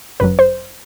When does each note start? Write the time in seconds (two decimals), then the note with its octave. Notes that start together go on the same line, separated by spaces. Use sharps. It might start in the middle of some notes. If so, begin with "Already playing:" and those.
0.20 G1 F#2 F#3 B4
0.39 C5